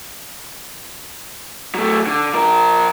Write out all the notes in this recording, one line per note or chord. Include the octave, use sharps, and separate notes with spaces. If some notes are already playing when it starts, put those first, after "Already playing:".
F#3 A3
D3
F3 A#4